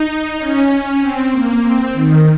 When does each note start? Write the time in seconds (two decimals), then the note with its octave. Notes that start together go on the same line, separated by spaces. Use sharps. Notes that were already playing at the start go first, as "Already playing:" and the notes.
Already playing: D#4
0.37 C#4
0.99 C4
1.31 A#3
1.62 C4
1.93 D#3